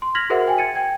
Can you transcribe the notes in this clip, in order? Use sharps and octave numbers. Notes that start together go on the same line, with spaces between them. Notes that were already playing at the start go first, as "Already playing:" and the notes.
C6
F6 G#6 A#6 B6 F7 F#7
F#4 G#4 A#4 C5 E5 F#5
F#4 G5 G#5
G#6 A6 C#7 D#7
G5 G#6